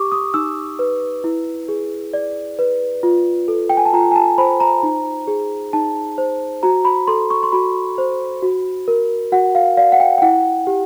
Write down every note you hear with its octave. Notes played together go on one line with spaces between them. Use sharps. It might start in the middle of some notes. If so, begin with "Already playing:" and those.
Already playing: G4 C#6 D6
D#6
D#4 E6
B4
E4
G#4
D5
B4
F4
A4
G5
G#5
A5
F4 A#5
G#5
A5
C5 B5
A#5
D#4
G#4
D#4 A5
C5
F#4 A#5
B5
A4 C6
C#6
C6
F#4 B5
C5
F#4
A#4
F#4 F#5
F5
D5 F5
F#5
G5
G5
E4 F#5
G4